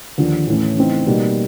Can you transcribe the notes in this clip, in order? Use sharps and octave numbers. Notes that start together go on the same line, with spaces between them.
D#2 D3 F3
A2 E3 A3 C#4
C#3 E3 A3 C4 D#4
B2 G3 A#3 D#4